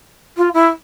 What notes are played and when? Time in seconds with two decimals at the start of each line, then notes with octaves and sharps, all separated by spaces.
0.37 F4
0.54 E4